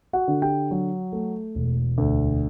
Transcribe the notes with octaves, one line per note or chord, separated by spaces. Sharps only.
F#4 F#5
D3
G4 G5
F#3
A3
E1
D2